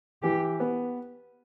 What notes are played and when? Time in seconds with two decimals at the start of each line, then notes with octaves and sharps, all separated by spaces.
0.23 E3 G4
0.60 B3